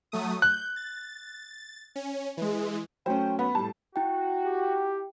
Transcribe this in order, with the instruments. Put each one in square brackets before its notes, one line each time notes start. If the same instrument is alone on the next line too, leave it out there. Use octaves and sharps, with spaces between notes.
[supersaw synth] F#3 A3 D#6
[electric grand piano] F#6 [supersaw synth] G6
[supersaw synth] A6
C#4
E3 G#3
[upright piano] F#3 A3 C#4 [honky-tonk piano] C5 [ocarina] G5
[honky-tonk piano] B3 [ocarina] B5
[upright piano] A2 G3 [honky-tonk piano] A5
[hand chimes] E4 G5 [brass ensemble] F#4
[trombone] G4